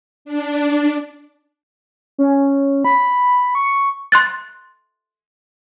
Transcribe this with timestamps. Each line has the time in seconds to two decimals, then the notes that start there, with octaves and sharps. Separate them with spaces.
0.25 D4
2.18 C#4
2.85 B5
3.55 C#6
4.12 C6 F#6 A6